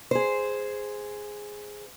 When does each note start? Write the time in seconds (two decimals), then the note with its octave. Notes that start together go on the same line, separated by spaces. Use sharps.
0.11 G#4 C5